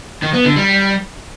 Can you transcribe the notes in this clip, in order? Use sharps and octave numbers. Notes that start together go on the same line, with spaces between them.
D#3
B3
D3
G3